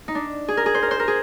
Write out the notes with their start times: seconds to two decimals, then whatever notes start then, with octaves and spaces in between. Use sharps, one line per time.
0.08 D#4
0.15 D4
0.48 G#4
0.57 A#4
0.66 G#4
0.75 C5
0.82 A#4
0.91 C5
1.00 A#4
1.08 G#4